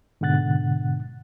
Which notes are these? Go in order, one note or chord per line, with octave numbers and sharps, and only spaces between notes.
G#2 B2 D3 F#5 F#6 A6